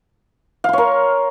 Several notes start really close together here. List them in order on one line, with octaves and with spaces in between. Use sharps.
F5 C6 C#5 A#4